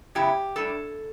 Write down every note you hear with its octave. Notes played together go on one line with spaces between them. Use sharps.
F#2 C#3 E3 B3 E4 G4
A2 G3 D4 A4